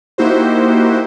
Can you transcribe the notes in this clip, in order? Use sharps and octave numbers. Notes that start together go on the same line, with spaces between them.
A#3 D#4 E4 F#4 G4 C5